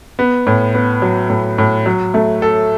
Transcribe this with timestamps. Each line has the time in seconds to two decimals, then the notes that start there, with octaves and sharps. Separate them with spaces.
0.19 B3
0.47 A2
0.74 B3
1.02 F#3
1.30 A2
1.58 A2
1.86 F#3
2.14 A3
2.42 A4